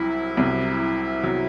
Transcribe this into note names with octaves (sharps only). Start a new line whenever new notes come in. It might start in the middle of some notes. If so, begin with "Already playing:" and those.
Already playing: C2 C3 F#3 E4
C2 C3 F#3
C3 F#3